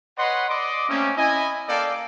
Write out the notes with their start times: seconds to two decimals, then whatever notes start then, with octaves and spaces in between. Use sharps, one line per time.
0.18 B4 C#5 D#5 F#5 C6
0.50 D5 D#5 C6 D6
0.89 A3 A#3 C4 C#4
1.17 E4 D#5 G#5
1.69 A#3 A4 D5 F5 G5 A5